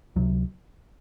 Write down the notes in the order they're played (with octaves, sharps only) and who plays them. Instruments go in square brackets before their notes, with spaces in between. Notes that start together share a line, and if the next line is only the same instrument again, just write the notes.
[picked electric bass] C#2 C3 F#3